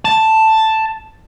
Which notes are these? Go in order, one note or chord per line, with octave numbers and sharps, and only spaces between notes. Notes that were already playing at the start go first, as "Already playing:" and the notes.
A5